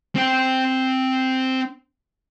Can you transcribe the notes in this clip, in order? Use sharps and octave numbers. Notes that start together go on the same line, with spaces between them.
C4 G5